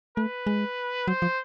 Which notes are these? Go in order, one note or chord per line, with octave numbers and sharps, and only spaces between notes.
A3 B4
G#3
F#3 C5
F3